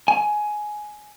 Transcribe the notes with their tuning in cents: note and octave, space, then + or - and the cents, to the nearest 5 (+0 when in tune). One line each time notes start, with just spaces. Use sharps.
G#5 +15